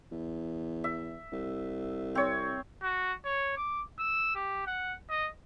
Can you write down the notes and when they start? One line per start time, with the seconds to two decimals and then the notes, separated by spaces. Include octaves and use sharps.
0.12 E2
0.84 E5
1.32 C2
2.15 C4 C#5
2.83 F#4
3.25 C#5
3.57 D6
3.99 E6
4.35 G4
4.67 F#5
5.09 D#5